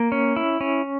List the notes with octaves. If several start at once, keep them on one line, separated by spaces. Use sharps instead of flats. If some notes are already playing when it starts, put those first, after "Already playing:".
Already playing: A#3
C#4
E4
C#4